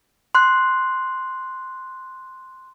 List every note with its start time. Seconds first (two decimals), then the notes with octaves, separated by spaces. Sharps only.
0.35 C6 F#6